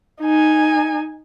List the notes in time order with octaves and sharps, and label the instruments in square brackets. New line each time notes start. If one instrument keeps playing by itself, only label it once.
[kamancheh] D#4 G#5